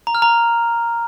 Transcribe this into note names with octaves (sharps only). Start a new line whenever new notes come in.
A#5
F6
A#5